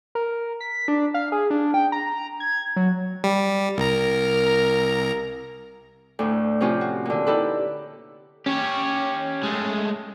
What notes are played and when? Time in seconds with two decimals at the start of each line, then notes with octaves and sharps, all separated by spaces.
0.15 A#4
0.61 B6
0.88 D4
1.14 F5
1.32 G#4
1.50 D4
1.74 G5
1.92 A#5
2.40 G#6
2.76 F#3
3.24 G3
3.78 C2 A#4 A#5
6.19 D2 A2
6.60 C3 F3 C#4 F4 G4
6.81 F#4
7.05 A#2 D3
7.26 D#4 E4 G4 A4 B4
8.46 C#4 G4 C#5
9.43 G#3 A3